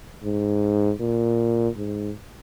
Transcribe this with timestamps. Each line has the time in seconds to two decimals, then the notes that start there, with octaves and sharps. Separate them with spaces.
0.23 G#2
1.00 A#2
1.77 G#2